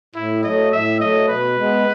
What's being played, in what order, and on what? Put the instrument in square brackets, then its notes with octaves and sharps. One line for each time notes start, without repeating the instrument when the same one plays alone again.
[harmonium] A2 [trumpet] E4
[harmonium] F#3 A3 [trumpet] D#5
[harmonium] A2 [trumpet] E5
[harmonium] F#3 A3 [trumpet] D#5
[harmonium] B2 [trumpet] B4
[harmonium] G#3 B3